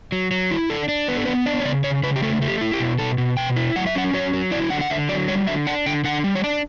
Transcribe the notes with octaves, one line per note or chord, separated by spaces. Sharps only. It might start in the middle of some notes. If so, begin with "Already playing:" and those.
F#3
F#3
E4
D4 A4
D4
B3 B4
A4
B3 B4
D4 D5
C#5
C#3 D5
C#3 C#5
C#3 B4
G4
A3 A4
A3
G4
E4
G4
B2
B2 A4
B2
B2 G5
E4
F#3 F#5
E5
C#4 F#5
F#3 C#5
F#3
E4 D5
D3 F#5
F#5
D3 E5
F#3 D5
G3 C#5
D3 E5
D4 F#5
D3 G5
D3 F#5
G3
C#5
D4 D5